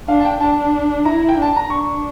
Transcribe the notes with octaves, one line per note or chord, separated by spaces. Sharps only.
D4 F5
A5
G5
D4 A5
E4 A#5
G5
D4 A5
A#5
D4 C#6